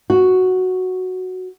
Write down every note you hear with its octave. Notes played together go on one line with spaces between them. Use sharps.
F#4